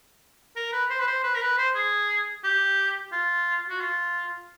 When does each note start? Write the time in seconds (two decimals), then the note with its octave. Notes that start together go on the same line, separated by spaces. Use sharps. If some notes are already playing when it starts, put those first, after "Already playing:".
0.56 A#4
0.72 B4
0.90 C5
0.99 B4
1.07 C5
1.24 B4
1.35 A#4
1.42 B4
1.58 C5
1.75 G#4
2.44 G4
3.12 F4
3.69 F#4
3.80 F4